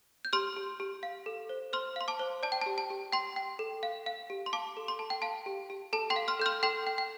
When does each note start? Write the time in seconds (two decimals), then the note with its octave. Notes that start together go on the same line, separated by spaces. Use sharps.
0.25 G6
0.33 G4 C6 F6
0.56 G4
0.80 G4
1.03 F5
1.26 A4
1.49 C5
1.73 C5 C6 F6
1.96 F5 C6
2.08 A5 D6
2.19 C5
2.43 D5 A5
2.52 G5
2.61 G4 A5
2.78 A5
2.90 G4
3.13 G5 C6
3.36 G5
3.59 A4
3.83 F5
4.06 F5
4.30 G4
4.46 C6
4.53 F5 A5 D6
4.77 A4
4.88 C6
4.99 A4 A5
5.10 G5
5.22 F5 A5
5.46 G4
5.70 G4
5.93 A4 A5
6.10 G5 C6
6.16 F5
6.28 C6 F6
6.40 A4 G6
6.46 C6 F6
6.63 A4 G5 C6
6.87 G5
6.98 G5